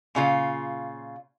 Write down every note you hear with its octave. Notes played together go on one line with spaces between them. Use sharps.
A#2 C#3 F4 F5